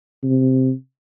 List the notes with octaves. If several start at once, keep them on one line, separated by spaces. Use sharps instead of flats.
C3